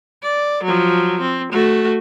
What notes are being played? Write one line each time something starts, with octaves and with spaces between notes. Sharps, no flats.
D5
F3 F#3
C4
A3 F#4